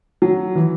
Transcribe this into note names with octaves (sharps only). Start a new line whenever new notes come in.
F#3
E3